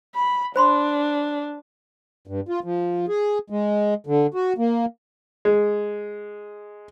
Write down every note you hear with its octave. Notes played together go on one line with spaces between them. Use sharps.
B5
D4 C5 B5 C6
G2
F4
F3
G#4
G#3
D3
F#4
A#3
G#3